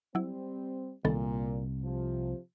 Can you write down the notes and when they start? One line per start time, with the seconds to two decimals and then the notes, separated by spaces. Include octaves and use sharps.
0.15 F#3 G3 C4 E4
1.05 C2 A#2 D#3 B3 A4
1.83 C3 F3